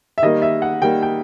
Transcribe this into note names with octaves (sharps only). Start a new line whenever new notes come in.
E5
D#3 G3 A#3 D#5
E5
F#5
D#3 G3 A#3 G5
G5